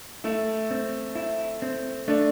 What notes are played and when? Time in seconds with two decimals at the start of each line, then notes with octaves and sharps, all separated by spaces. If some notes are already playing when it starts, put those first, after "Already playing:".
0.24 A3 E4
0.71 C4
1.15 E4
1.62 C4
2.08 A3 D4